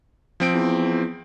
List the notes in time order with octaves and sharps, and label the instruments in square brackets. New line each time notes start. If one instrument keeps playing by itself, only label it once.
[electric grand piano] F3 C4 D7
[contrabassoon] E2